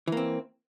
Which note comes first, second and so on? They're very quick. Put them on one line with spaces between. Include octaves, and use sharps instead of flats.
E3 A#3 C4